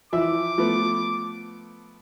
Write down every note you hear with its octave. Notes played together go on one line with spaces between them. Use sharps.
E3 F3 E5 D6
F3 A3 B3